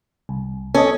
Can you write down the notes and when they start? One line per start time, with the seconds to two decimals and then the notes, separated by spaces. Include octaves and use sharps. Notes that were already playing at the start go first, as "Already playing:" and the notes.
0.29 C2
0.75 C#4 A4 D#5